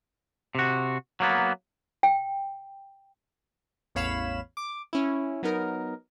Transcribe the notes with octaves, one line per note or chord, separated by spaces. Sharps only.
C3 F#4
F#3 A#3 B3
G5
A1 E2 C#5 F5 B5 E7
D6
C#4 E4
F#3 B3 D#4 A#4